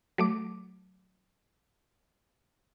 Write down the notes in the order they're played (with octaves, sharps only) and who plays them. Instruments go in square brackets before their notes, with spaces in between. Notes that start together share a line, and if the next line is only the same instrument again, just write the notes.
[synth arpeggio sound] F#3 A3 D6